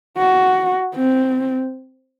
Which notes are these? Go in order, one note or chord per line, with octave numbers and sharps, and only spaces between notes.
F#4
C4